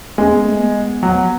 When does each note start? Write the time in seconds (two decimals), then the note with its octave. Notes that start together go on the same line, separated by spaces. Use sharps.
0.18 G#3 C#4
0.32 B3
0.45 A3
0.59 B3
1.03 F#3